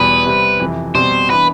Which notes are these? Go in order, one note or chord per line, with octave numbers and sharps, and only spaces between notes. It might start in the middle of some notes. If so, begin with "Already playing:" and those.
Already playing: E2 B2 G3 B4
C3 G3 C4
F2 C3 E3
B2 G3 C4 C5
E3 B3 D4 B4